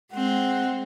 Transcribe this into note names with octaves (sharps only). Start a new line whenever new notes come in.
G#3 C4 F#5